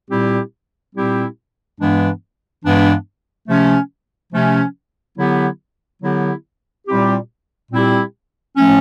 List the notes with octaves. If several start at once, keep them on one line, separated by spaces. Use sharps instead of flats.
A#2 G3 C4 E4 G4
A#2 G3 C4 E4 G4
G2 E3 G#3 B3 D4
G2 E3 G#3 B3 D4
C3 F3 A3 C#4
C3 F3 A3 C#4
D3 F#3 B3 E4 G4
D3 F#3 B3 E4 G4
A#2 G3 C4 E4 G4
A#2 G3 C4 E4 G4
A2 F3 A3 C#4